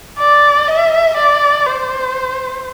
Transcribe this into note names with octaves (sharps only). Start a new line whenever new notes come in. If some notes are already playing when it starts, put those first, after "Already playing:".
D5
E5
D5
C5